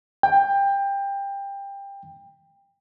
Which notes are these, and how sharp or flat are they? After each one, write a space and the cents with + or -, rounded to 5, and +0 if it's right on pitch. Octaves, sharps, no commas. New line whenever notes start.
G5 +20